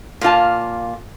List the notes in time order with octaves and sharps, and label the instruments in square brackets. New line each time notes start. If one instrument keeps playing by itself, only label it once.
[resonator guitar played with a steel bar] A#2 A#3 F4 A5